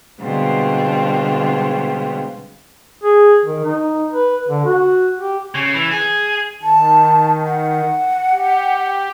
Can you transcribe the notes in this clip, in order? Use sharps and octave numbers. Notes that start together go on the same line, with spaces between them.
B2 D3 G3 G#3 C4 F4
G#4
D#3
D#4
B4
D3
F#4
G4
C#3
E3
G#4
D#3 A5
F#5
G4